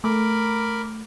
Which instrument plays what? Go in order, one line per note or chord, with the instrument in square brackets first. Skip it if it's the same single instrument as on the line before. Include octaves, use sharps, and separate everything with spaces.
[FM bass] A3 [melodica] A#4 B5 D6